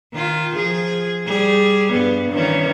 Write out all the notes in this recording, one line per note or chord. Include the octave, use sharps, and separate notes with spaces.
D#3 F4
F3 G#4
G3 G#4
G2 B3
D#3 E3 C#4